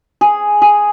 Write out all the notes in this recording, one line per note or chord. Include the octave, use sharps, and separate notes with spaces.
G#4
G#4